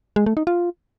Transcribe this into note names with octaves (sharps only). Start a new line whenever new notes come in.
G#3
A3
D#4
F4